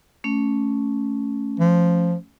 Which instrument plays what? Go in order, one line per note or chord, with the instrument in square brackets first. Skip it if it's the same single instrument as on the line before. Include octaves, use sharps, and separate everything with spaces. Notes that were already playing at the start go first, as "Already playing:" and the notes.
[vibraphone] A3 C#4
[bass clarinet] F3